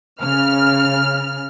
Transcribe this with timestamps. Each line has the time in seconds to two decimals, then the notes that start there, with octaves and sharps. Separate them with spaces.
0.22 C#3 F6